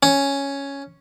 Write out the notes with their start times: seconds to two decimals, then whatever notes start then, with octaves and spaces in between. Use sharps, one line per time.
0.03 C#4